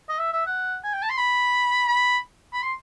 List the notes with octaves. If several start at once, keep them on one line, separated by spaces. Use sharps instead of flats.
D#5
E5
E5
F#5
G#5
G5
A5
C6
B5
B5
B5
C6